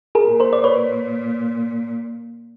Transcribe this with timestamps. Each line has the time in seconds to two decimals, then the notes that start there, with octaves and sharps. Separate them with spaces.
0.15 G#4 A#4
0.27 A#2
0.40 A#4 C5
0.53 D5
0.64 B4 C#5